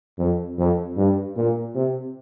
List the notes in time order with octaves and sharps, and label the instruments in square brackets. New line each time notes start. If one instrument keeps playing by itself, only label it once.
[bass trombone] F2
F2
G2
A#2
C3